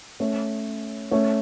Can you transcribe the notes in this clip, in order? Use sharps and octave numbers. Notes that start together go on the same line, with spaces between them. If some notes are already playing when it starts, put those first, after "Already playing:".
A3 C#4
A3 C#4